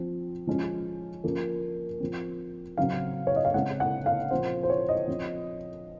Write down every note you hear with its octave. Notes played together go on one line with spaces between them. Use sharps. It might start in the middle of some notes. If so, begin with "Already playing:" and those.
Already playing: F3 C4
F3 G#3 C#4
F3 A#3 C#4
F3 C4
C#3 F#3 C4 F5
C#5
D#5
F5
C#3 G#3 C4 F#5
F#5
F5
A#2 F3 C4 C5
C5
C#5
D#5
F3 C4